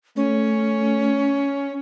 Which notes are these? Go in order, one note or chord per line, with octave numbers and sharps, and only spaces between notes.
A3 C#4